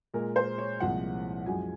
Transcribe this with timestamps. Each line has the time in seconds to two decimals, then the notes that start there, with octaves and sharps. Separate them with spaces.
0.14 A#2 G#3 A#4
0.36 C5
0.58 C#5
0.80 C2 A#2 F3 G#3 F#5
1.46 F#2 F3 G#3 G#5